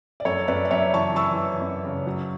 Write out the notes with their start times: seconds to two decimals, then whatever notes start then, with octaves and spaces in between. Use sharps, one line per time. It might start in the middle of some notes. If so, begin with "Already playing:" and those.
0.20 D5
0.25 F#2 A4 C#5
0.48 F#2 B4 D5
0.65 D5
0.71 F#2 C#5 E5
0.94 E3 A5 C#6
1.15 E3 C#6 E6
1.38 E3
1.61 F#2
1.84 C#3
2.07 F#3